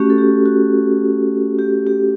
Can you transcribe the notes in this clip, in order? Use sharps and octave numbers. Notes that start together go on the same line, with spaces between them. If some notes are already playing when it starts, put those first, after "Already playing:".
Already playing: A3 C#4 F#4 G4
A4
G4
F#4
G4
G4